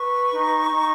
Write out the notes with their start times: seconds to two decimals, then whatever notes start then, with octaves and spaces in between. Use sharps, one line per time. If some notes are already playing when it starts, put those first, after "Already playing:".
Already playing: B4 C#6
0.31 D#4
0.72 D#4